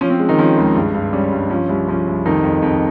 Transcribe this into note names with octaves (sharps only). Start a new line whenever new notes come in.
F3 C#4
C4
G#3
D#3 D#4
F3 C#4
C#2
G2
G2
G3 C#4
G2
F3 C#4
C2
F3 C#4
C2
F2 D#3 D#4
F2
F2